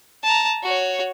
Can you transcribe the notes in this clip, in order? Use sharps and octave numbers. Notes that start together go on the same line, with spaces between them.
A5 A#5
F#4 C#5